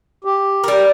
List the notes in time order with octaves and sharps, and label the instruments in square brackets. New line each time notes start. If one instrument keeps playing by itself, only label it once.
[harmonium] G4
[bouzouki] G3 A#4